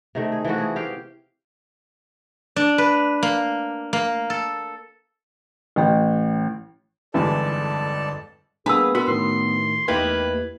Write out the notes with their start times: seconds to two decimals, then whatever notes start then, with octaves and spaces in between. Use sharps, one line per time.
0.15 C3 D#3 A3
0.32 G#4
0.45 E3 F3 A3 F#4
0.58 G#4
0.76 G4 F5
2.56 D4
2.78 B4
3.23 A#3
3.93 A#3
4.30 A4
5.76 A1 G5
7.14 G1 F2 G#2 C3 E3 A4 D5 A5
8.66 G3 A#3 B3 D4 G#4 B4 B5 E6
8.95 B3 F#4 A#4 B4 B5
9.08 A2 D#3 C6
9.88 E2 A#3 D#4 E4 G4 B4 G#6